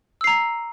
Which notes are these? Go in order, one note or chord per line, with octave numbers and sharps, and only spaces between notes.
A#5 E6 C7